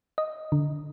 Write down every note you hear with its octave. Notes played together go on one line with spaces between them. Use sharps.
D#5
D3